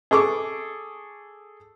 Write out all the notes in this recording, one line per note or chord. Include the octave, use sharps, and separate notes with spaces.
G#4 A4 C#6 D6